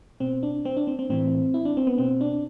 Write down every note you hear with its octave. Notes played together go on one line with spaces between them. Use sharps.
B2 C4
D4
C4
D4
C4
C4
A2 E3 C4
E4
D4
C4
B3
B2 C4
D4